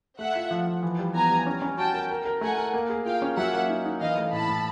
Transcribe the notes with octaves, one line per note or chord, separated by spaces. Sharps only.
A3 E5 F#5
F4
F3
F3
E3
G3
B3 G#5 A#5
G3
C#4
C#4
F#4 G5 A5
A#4
A#4
A#4
A3 F#5 G#5
A#4
A#3
G#4
F4 F5 G5
C#4
F#3 E5 F#5
A#3
D#4
D#4
E3 D#5 F5
A3
A2 A5 B5
A2